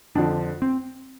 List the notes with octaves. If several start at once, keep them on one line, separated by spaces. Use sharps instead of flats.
F2 D3 F3 D4
C4